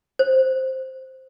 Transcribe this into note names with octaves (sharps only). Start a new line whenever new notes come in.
C5